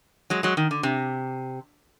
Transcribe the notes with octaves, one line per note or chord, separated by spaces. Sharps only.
F#3 G#3
F#3 G#3
D#3
D3
C3